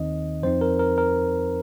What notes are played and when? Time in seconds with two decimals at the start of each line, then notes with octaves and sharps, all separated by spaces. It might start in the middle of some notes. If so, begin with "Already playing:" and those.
Already playing: D#2 D#3 C4 D#4 D#5
0.43 F2 F3 C4 D#4 C5
0.61 A#4
0.79 A#4
0.98 A#4